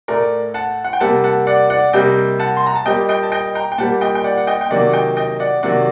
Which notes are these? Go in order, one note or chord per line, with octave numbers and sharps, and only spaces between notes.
A2 A3 A#4 D5
F#5 A5
F#5
G5
C3 G3 A#3 F#5 A5
F#5 A5
D5 F#5
D5 F#5
C3 G3 A#3 D#5 G5
F#5 A5
C6
A#5
A5
A#2 G3 A#3 D#5 G5
D#5 G5
A5
D#5 G5
G5 A#5
G5
A#2 G3 A#3 F#5 A5
D#5 G5
G5
D5 F#5
F#5
D#5 G5
G5
C3 D#3 F#3 A#3 D5 F#5
F#5
D#5 G5
D#5 G5
D5 F#5
C3 D#3 F#3 A#3 D5 F#5